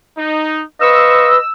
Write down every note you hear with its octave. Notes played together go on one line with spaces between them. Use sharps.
D#4
B4 C5 D#5 F5 C#6 E6